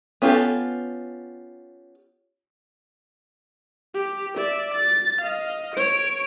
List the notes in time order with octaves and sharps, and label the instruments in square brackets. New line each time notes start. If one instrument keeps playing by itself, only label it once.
[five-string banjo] B3 C#4 F4 G4 A4
[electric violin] G4
D5 E5
A6
D#5 F5
C#5 D7